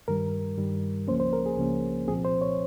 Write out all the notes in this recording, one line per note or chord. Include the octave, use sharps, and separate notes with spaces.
G2 D#3 G3 A#4
G2 D#3 G3
C#2 C#3 F3 A#3 C#4 C5
C5
A#4
G#4
C#2 C#3 F3 A#3 C#4
C2 A#2 F3 C4 G#4
C5
C#5